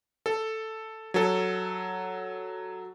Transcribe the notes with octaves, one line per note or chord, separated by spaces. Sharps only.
A4
F#3 A4